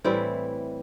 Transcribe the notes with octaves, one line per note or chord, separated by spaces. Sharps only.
A2 E3 G3 C4 E4